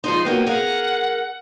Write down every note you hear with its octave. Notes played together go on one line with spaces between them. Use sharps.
F3 G#3 D#4 C6
F#3 A#3 B3 G5
G#4 A#4 F5 F#5